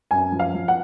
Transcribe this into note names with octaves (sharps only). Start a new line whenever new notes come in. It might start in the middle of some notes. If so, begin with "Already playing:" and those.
F#2 G#5
F3
F5
F3
F#5